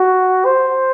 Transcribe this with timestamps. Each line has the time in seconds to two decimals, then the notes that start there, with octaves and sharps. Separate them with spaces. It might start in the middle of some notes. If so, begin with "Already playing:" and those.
Already playing: F#4
0.45 C5